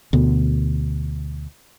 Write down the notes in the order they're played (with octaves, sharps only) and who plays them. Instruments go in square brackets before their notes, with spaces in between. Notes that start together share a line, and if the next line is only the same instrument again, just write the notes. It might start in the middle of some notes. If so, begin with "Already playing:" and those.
[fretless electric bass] D2 B2 B3